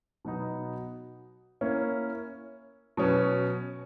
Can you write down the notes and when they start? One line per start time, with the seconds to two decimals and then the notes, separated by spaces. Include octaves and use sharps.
0.25 B2 F#3 B3 D#4
1.61 A#3 C#4 E4
2.97 B2 F#3 C#4